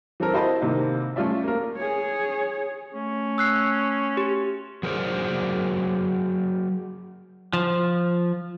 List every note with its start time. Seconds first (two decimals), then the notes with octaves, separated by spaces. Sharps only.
0.20 E3 C4 A4 A#4
0.34 E4 F#4 C5 D#5 A5 B5
0.61 C3 D#3 G3 A#3
1.16 A3 C#4 F4 D5 E5
1.44 A#3 A#4
1.77 G#4 C#5
2.94 A3 C#4
3.38 E6 F#6 C7
4.17 G4
4.83 F#3 G#4 A#4 C5 D5
7.53 F3